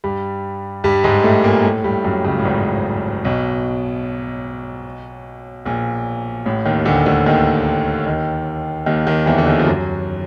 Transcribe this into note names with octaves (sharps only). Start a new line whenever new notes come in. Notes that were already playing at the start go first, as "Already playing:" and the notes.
G2 G3
G2 G3
G#2 G#3
A2 A3
A#2 A#3
A2 A3
G2 G3
F#2 F#3
C#2 C#3
A2
G#1 G#2
B1 B2
A#1 A#2
A1 A2
D#2 D#3
D2 D3
D2 D3
D#2 D#3
D#2 D#3
D#2 D#3
D#2 D#3
E2 E3
D3
D#2 D#3
F3
F#2 F#3